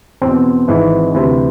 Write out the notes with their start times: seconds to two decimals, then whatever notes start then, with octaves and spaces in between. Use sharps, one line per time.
0.22 E2 B2 C4
0.68 G#1 G#2 E3
1.14 D2 C3 E3